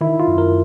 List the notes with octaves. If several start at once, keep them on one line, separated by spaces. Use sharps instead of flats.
D#3 E4
F4
F#2
A#4